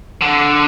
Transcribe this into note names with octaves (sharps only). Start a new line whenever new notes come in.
D3